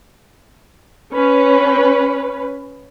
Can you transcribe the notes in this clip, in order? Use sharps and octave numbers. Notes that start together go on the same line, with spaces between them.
C#4 B4